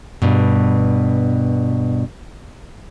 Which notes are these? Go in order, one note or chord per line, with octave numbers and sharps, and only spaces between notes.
G2 B2